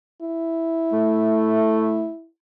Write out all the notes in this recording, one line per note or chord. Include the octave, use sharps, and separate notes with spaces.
E4
A3